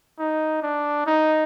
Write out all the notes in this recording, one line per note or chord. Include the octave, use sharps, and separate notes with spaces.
D#4
D4
D#4